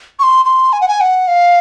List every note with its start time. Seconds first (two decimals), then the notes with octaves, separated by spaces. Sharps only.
0.19 C#6
0.23 C6
0.45 C6
0.73 G#5
0.81 F#5
0.88 G#5
1.01 F#5
1.28 F5